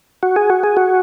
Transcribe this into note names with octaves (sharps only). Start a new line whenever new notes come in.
F#4
G#4
F#4
G#4
F#4